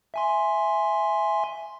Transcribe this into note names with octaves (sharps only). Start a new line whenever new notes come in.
E5 G#5 C6